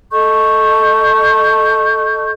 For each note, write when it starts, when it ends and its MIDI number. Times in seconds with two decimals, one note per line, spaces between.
0.12 2.31 69
0.12 2.31 75
0.12 2.31 85
0.12 2.31 91